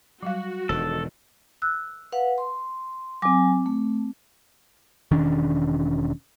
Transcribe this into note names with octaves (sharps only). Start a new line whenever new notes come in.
F#3 G3 F#4 F5
E1 D#3 A4
E6 F#6
B4 F5 F#5
C6
F#3 C4 G#5 D6
A3
E1 D#3 C#4 D4